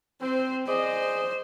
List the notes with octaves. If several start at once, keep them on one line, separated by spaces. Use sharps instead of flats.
C4 C5
G#4 C5 D5 D#5